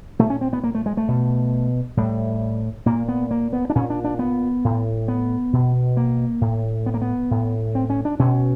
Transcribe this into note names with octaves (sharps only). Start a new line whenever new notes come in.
A#2 A3
C#4
C4
B3
A#3
A3
G#3
A3
B2
A2 G3
A#2 A#3
B3
A#3
B3
D4
A#2 C#4
D4
D4
B3
A2
B3
B2
A#3
A2
B3
A#3
B3
A2
C4
C#4
D4
B2 C#4